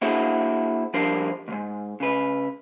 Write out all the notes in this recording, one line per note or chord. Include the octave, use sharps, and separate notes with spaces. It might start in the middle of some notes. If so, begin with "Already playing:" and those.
A#3 D4 E4 F#4 G#4 C5
F3 G3 D4 A#4 C5
D2 G#2
C#3 B4